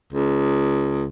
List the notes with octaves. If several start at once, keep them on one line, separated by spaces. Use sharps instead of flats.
C#2